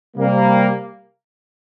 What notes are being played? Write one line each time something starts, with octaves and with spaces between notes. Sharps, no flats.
C3 G3 A#3